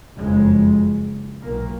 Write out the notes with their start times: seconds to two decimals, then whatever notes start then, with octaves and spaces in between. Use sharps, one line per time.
0.17 F#1 F2 C#3 G#3
1.42 B1 A#2 A#3